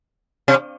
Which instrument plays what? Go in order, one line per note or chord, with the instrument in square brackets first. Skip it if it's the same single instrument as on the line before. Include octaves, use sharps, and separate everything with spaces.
[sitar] C3